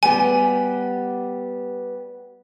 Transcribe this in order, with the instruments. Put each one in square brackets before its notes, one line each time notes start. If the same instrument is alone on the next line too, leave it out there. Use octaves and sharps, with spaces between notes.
[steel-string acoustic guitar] G3 B3 G4 [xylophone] G#5